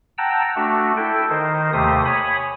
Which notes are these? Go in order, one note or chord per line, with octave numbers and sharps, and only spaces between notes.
F#5 G5 A5 A#5 E6
A3 D4 F#4
E4 A4 G5
D#3 D#4 C5
D#2 C3 A3 G4 C5 D#6
C#5 G#5 B5 D#6